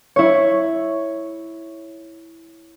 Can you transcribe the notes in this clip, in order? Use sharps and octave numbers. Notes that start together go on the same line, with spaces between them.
E4 C#5